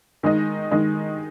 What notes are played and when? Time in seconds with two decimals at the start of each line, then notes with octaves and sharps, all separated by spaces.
0.23 D#3 G#3 D#4
0.71 D#3 G#3 D#4